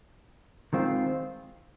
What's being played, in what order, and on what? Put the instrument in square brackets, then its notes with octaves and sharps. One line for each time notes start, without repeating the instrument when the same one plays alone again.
[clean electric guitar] D#3 G#3 C4 F4